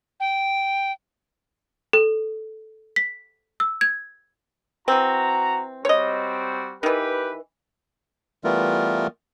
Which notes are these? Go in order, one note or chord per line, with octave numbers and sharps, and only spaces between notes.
G5
A4
B6
E6
G#6
E3 C4 F#4 A#5
G3 C4 F#4 C#5 D#5
D#3 E3 G4 B4
E3 G3 A3 B3 F4 A#4